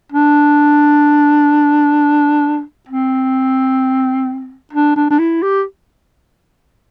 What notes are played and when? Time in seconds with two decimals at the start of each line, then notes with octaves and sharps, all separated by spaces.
0.12 D4
2.89 C4
4.73 D4
4.96 D4
5.11 D4
5.19 E4
5.42 G4